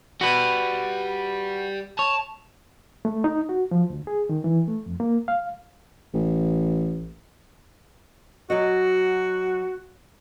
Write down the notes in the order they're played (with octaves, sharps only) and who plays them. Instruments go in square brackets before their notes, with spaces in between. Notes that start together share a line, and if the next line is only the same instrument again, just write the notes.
[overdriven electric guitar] G3 [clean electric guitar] F#4 B4
[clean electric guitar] C#5 [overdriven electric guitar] A5
[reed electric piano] A3
D#4
F#4
F3
D2
G#4
D#3
E3
A3
F2
A#3
F5
[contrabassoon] A1
[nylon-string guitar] F#3 C#5 D#5 [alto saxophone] F#4